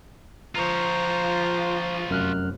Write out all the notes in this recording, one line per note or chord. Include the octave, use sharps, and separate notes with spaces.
F3 F4 C5 C#5 A#5
F1 F#2 F6 F#6